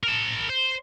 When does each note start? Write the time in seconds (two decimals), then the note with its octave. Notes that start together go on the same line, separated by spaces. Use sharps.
0.03 A#4 A5
0.49 C5